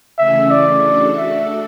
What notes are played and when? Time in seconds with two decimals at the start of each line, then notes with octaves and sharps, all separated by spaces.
0.18 C#3 E3 A3 C#4 G#4 E5
0.51 D5
0.83 A3 D4 F#4 A4
1.16 E5